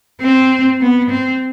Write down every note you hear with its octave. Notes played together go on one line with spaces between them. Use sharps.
C4
B3
C4